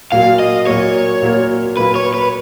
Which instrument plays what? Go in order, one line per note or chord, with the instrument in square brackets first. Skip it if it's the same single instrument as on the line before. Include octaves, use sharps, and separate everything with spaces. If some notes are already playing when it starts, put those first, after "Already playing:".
[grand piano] A#2 F#3 A#3 [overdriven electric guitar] F5
[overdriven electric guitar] D#5
[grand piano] A#2 F#3 A#3 [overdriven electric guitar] C#5
[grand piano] A#2 F#3 A#3
[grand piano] A#2 F#3 A#3 [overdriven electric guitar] B4
[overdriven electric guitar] C#5
B4